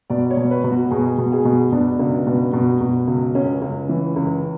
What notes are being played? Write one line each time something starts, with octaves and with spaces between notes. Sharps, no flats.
B2 D5
C#5
B2
B4
B2
F#4
B2 G#4
B2
G#4
B2
B2 D4
C#2
B2
B2
B2
C#2
C#2 C#4
C#2
E3
C#2